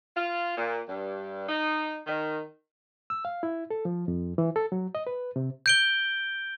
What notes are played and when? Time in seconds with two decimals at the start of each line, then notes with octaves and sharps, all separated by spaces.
0.16 F4
0.58 A#2
0.88 G2
1.48 D#4
2.07 D#3
3.10 E6
3.25 F5
3.43 E4
3.70 A4
3.85 F3
4.08 F2
4.38 E3
4.56 A4
4.72 F#3
4.95 D#5
5.07 B4
5.36 C3
5.66 G6 D7 G7